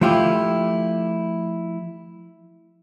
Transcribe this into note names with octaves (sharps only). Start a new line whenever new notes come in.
F3 A3 E4 F4 G4